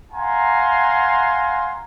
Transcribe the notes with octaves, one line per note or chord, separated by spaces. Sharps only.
F5 F#5 G#5 A#5 C6